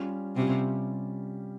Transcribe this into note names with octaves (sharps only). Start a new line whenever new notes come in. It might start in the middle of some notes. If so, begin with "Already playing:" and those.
Already playing: G3 C#4 F4
C3 G3 C#4 F4